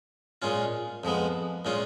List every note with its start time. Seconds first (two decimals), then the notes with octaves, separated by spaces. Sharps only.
0.42 A#2 G#3 C#4 F4
1.04 F2 F3 G#3 B3
1.65 A#2 G#3 C#4 F4